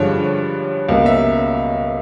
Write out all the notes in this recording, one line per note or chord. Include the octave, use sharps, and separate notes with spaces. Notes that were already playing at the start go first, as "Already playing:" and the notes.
Already playing: G2 D3 F3 G#3 C#5
C#2 B2 F#3 A#3
E5